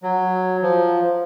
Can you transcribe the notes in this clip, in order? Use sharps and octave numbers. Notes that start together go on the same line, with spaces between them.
F#3
F3